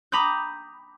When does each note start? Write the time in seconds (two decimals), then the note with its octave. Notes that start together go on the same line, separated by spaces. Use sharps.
0.12 A#5 B5 D6 D#6 G6